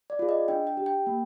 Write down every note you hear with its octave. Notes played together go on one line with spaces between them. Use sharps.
D5
F4 G#4
D#5
D4 G5
G5
G4
G5
A#3